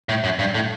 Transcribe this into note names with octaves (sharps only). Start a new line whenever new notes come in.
A2
F#2
G2
A2